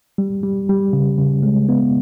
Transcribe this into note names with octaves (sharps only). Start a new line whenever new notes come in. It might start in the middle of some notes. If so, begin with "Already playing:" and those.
G3
G3
G3
C#3
C#3
G#3
B3